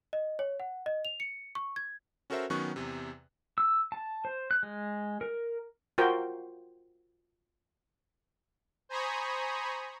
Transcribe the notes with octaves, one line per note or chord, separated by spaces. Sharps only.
D#5
C#5
F#5
D#5
F7
C#7
C#6
G#6
C#4 F#4 A4 A#4 C5 E5
D#3 F#3 B3 C#4 C#6 F#6
E2 C3
E6
A5
C5
F#6
G#3
A#4
F4 F#4 A#4 C5 G5
C5 G#5 A#5 B5 C#6 D#6